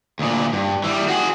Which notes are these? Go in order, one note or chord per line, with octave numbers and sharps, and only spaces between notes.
D2 A#2
G2
E3 G3
F#4 G#4